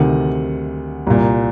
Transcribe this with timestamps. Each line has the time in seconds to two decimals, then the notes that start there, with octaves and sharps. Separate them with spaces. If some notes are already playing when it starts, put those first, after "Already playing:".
Already playing: D2 C3 D#3 F#5
1.07 C2 A#2